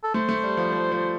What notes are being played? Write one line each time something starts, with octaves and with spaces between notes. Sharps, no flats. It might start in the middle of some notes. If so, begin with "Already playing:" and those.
A4
A3 C5
A3
G3
F3
F3
F3